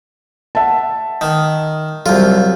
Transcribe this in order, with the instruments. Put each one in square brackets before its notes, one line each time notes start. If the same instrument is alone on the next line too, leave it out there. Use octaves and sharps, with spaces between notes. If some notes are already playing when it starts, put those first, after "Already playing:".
[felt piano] E5 F#5 A5
[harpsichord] D#3
[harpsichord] C2 F4 [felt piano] F#3 G3